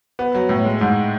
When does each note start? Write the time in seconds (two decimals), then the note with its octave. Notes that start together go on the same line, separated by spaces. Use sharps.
0.19 B3
0.35 F#3
0.49 A2
0.65 G#3
0.81 G#2